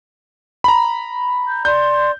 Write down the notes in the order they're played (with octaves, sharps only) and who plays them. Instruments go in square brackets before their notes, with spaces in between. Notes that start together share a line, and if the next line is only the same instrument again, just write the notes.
[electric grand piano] A#5 B5
[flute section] G6
[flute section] D5 C6 [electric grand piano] G6